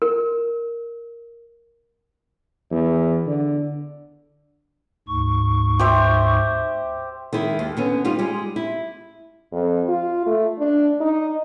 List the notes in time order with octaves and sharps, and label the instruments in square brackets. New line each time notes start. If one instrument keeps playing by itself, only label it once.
[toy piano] A#4
[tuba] E2
D3
[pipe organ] D2 G#2 C#6
[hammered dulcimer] G4 C5 E5
[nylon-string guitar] D#3 G#3 E4
D#2
D3 B3 C#4
G3 D#4 F4
G3 G#3
E4
[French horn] F2
F4
A3
D4
D#4